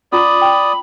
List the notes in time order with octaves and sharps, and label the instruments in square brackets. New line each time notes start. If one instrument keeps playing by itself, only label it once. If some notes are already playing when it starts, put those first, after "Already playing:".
[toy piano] C#4 F4 A#5 [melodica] D5 D#6 [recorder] B5
[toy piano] G5